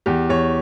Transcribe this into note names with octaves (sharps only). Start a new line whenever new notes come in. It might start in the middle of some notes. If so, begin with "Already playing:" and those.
E2 G4
E2 C#5